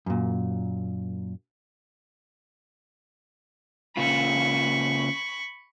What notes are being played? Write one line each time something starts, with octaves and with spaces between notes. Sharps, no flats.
F#2 A#2
C#3 A#3 F4 B5 C#6